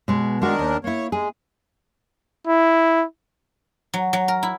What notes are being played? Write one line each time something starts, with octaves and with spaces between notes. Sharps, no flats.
B2 G#3 B3
D#3 G#3 A3 D4 F#4 A#4
D#2
A#3 E4 C#5
G#3 G#4
E4
F#3
F#3
A#4
E4